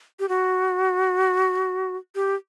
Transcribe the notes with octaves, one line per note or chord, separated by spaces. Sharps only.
G4
F#4
G4